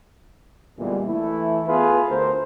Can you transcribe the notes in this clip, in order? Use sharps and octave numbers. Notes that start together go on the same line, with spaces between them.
A#2 D3 E3 G3 G#3 B3
E3 A3 E4
B3 F4 G#4 A4 B4
D2 A3 A#4 C5